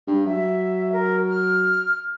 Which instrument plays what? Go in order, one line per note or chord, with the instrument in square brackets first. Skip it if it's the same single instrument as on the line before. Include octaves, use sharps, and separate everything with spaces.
[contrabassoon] G2
[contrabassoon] F#3 [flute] E5
[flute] A#4
F6